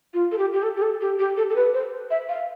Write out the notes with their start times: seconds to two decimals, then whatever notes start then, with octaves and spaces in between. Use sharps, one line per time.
0.14 F4
0.32 A4
0.38 G4
0.54 G4
0.63 A4
0.76 G4
0.82 A4
1.01 G4
1.19 G4
1.37 A4
1.50 A4
1.56 B4
1.74 C5
2.11 E5
2.29 F5